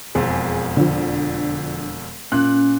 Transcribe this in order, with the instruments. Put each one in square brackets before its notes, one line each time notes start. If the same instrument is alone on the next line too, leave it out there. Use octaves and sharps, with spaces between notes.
[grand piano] E1 F2 [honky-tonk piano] G#4
[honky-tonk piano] D3 F3
[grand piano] A#2 [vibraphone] C#4 [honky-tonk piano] F#6